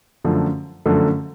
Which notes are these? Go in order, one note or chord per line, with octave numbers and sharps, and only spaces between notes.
F#2 D3 F3 A3
F#2 D3 F3 A3